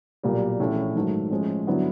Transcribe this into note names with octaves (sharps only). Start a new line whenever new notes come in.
B1 A#2 G3
A#1 A2 E3 A3 C#4
G#2 D#3 F#3 A3
A2 F3 G#3 C#4
G2 D3 F#3 B3 E4